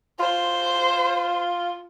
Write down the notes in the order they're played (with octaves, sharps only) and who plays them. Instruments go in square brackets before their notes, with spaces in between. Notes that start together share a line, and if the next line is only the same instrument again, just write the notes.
[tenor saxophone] F4 [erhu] C5